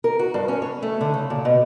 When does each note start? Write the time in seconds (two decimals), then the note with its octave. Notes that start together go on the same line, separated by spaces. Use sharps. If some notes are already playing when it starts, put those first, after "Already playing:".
0.04 A#4
0.19 F#4
0.34 G2
0.48 C#4
0.62 C#5
0.82 A3
1.01 D3
1.14 C#3
1.30 A#2
1.45 B2